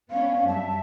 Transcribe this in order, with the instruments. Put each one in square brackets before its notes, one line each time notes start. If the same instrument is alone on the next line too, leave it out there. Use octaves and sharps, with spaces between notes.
[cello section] B3 C#4 D4 [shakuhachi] F5
[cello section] F#2 G3 E5 [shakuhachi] A5